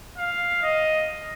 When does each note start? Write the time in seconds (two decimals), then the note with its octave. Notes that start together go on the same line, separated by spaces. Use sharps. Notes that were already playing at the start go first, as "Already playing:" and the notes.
0.18 F5
0.63 D#5